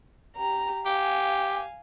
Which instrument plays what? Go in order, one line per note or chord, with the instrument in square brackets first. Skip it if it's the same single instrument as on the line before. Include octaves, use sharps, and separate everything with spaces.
[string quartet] G4 A#5
[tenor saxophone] G4 [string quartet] F5 G#5